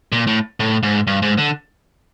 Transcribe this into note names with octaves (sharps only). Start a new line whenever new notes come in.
A#2
A2
A2
G#2
G2
G#2
D3